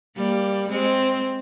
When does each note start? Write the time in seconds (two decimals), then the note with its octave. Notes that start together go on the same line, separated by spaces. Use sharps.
0.17 G3 A#3
0.71 G#3 C4